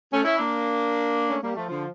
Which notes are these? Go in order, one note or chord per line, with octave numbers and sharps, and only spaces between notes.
A3 C#4
C#4 E4
A#3 D4
A3 C#4
G3 A#3
F3 A3
D3 F3